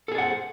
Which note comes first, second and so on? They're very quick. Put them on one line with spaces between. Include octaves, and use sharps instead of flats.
A4 G#4 D5 F#5 C5